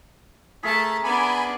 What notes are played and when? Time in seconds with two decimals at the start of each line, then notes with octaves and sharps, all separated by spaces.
0.63 A3 G#4 A#4 E5 A5 B6
1.04 B3 D4 G#5 B5 D6